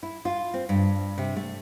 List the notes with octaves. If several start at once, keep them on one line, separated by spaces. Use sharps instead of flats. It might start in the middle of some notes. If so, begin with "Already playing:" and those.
E4
F4
C4
G2
C3
A3